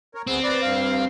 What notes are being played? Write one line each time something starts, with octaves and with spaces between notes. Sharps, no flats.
A#4 C#5
D2 G#3 B3 C4
B4 D5 D6
G2 F5